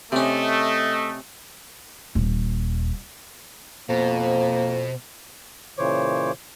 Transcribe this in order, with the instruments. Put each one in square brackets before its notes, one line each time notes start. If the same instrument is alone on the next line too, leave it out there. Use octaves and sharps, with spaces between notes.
[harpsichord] C3 C#4 [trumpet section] A3 D#5
[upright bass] D#1
[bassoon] F2 [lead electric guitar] B2 [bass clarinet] A#3 [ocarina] C5
[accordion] A#2 C#3 E3 C5 C#5 D6